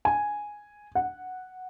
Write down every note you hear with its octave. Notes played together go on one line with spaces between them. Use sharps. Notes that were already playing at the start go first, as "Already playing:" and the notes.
G#5
F#5